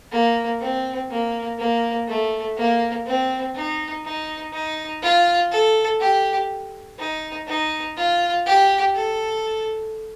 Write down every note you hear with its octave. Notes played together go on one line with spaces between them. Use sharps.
A#3
C4
A#3
A#3
A3
A#3
C4
D#4
D#4
D#4
F4
A4
G4
D#4
D#4
F4
G4
A4